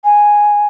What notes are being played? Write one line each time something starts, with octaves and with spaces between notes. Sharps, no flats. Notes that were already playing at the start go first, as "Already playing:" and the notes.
G#5